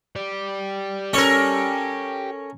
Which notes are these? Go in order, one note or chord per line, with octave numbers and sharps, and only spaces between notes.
G4 D5
C#4 A4 A#4 C#5